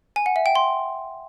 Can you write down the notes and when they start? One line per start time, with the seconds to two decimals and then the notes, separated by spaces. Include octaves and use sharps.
0.16 G#5
0.26 F#5
0.36 E5
0.46 G5
0.55 C6